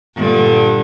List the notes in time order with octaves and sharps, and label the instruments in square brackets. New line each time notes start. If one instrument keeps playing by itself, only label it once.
[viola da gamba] G2 A#2 D3